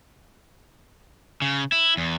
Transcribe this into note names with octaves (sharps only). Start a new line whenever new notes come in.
C#3
E4
E2